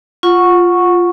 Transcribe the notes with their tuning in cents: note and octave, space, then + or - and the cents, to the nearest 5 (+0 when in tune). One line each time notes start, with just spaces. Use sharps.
F4 +0 F#5 -15 C#6 -5